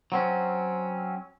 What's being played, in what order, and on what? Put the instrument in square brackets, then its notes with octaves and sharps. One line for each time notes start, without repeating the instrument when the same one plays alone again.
[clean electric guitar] F#3 C4 C#4